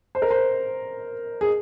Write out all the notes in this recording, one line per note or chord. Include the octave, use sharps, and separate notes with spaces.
C5
A#4
C5
G#4